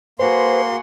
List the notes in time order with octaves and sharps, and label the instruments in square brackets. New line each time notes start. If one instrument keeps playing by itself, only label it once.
[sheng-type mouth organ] A#3 C6 [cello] F#4 G#4 [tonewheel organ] B4 C5